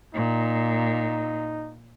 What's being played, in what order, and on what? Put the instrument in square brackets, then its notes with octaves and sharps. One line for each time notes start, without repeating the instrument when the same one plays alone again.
[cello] A#2 [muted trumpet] D#4